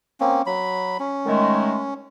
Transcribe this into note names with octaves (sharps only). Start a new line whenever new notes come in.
A#3 C4 C#4
F#3 B5
C#4
D#3 G#3 A3